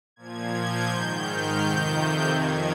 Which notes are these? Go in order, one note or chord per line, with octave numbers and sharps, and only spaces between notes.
A#2 F3 G#6
G6
G#2 D#3 G6
F6
F2 C3 D#3 G6
G6
F2 D#3 G#6